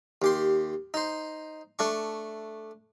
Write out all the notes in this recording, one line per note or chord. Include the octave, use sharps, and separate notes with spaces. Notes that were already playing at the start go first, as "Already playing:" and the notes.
D#2 G4 C6
D#4 C5
A3 D4 C#6